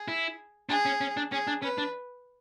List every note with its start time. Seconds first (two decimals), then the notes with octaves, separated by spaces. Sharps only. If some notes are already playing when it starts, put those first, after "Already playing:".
Already playing: G#4
0.08 E4
0.69 D4 G#4
0.86 C#4
1.01 C#4
1.17 D4
1.32 C#4 G#4
1.47 D4
1.62 C#4 B4
1.78 D4